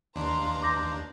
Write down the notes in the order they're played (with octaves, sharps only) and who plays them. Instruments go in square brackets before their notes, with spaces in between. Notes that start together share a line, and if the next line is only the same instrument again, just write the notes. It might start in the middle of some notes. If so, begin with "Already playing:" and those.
[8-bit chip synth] D#2 D4 [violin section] B4 F5 A#5 [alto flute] C6
[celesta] D6 G6 A#6